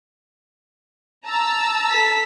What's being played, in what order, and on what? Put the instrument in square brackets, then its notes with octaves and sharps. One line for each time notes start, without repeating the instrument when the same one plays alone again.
[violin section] A5 A#5 E6
[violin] A4 B6